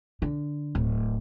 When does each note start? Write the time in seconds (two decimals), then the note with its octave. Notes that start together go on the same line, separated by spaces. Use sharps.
0.22 D3
0.75 D1